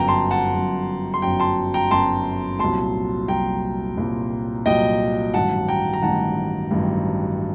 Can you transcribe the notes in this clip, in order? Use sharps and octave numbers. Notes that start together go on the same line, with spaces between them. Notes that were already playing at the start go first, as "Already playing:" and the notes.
Already playing: G1 F#2 F#3 G5 A#5
A5 C6
F#5 A5
G1 F#2 F#3
C6
G1 F#2 F#3 G5 A#5
A5 C6
G5 A#5
G1 F#2 F#3 A5 C6
C2 A#2 F#3 A5 C6
C2 A#2 F#3 G5 A#5
C2 A#2 F#3
C2 A#2 F#3 D#5 G5
A1 G2 D#3 F#3 F#5 A5
G5 A#5
A#5
A1 G2 D#3 F#3 F#5 A5
A1 G2 D#3 F#3